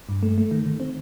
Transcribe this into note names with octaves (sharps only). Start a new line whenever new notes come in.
G2
A3
A3
D#3
D#3
C4